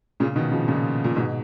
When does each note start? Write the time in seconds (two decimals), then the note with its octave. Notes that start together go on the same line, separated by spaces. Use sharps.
0.20 A#2 C#3
0.35 B2 D#3
0.51 C#3 F3
0.68 A#2 C#3
1.04 A#2
1.16 G#2 B2